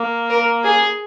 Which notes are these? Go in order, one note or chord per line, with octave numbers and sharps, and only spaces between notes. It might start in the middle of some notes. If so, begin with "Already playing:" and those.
Already playing: A#3
A#4
G#4